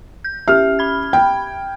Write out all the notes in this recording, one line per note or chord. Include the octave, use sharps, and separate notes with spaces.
G6
C#4 G4 E5 F6
B5 G#6
G5